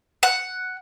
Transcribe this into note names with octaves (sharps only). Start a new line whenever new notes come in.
F#5